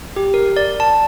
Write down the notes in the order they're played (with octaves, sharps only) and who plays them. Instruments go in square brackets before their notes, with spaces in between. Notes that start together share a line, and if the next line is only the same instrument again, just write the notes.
[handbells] G4
A#4
D5
A5